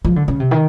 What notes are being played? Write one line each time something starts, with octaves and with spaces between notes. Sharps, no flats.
F3
D3
C#3
C3
D#3